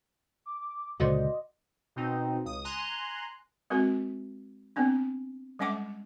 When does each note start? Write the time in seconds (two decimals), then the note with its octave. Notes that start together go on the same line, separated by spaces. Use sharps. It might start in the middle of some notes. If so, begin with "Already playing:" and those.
0.46 D6
1.00 C#2 A#2 D3 F#4 C5 D5 D#5
1.96 B2 C4 D#4
2.45 C#2 D#6
2.64 G#5 A#5 C6 F#6
3.70 G#3 C4 F#4 A#4
4.76 B3 C4 D4
5.59 G3 G#3 C#4 E5 F#5 D6